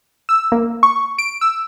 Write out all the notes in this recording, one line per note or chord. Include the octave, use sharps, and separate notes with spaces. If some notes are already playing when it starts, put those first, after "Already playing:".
E6
A#3
C#6
D7
E6